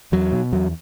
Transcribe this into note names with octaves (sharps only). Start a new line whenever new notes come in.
E2 F#3
B2
E2 F#3